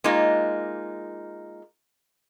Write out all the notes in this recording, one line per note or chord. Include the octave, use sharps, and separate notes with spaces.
G#3 A#3 D#4 F4